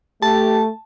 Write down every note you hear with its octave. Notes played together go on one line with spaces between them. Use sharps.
A3 G4 A5